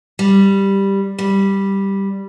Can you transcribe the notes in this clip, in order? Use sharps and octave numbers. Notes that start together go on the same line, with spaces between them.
G3
G3